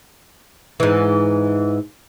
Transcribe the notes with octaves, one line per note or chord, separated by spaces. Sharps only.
G#2 E3